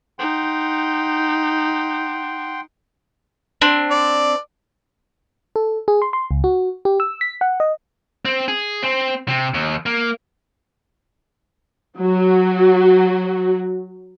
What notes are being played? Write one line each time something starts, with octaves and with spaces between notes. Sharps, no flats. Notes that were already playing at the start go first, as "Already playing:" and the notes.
D#4 F#5 G5 C6
C4 D4
D5
A4
G#4
C6
C6
C#2
F#4
G4
E6
B6
F#5
D#5
C4
G#4
C4
C3
D#2
A#3
F#3 F#4